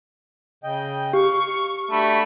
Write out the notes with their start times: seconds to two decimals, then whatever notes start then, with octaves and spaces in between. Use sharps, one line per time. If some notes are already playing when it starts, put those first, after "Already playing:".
0.64 C#3 D#5 G5
1.13 G4 F5 C#6
1.91 G3 A3 D4 F#4 B5